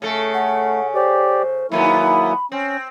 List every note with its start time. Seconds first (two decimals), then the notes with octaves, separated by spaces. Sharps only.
0.02 C#3 A3 A4
0.34 F#5
0.95 G4 C5 D5
1.72 G#2 D#3 F#3 A#3 B3 E4 B5
2.52 C4 C#4